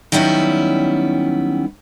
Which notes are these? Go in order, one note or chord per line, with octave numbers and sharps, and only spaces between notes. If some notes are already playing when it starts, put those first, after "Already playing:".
D#3 F#3 G3 B3 C#4 E4